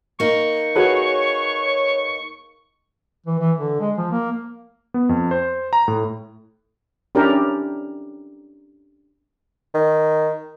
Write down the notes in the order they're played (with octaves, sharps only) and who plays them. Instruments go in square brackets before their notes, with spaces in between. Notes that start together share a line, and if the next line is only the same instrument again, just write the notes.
[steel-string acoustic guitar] A#3 D#4 [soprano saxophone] C#6
[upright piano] F#4 G#4 B4 [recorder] C#5
[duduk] E3
E3
D3
G#3
F3
A#3
[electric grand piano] B3
F2
C5
A#5
A2
[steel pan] C#4 D4 E4 G4 A#4
[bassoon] D#3